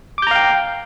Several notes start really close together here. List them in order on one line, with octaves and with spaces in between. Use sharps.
D6 G6 A#5 F5 G5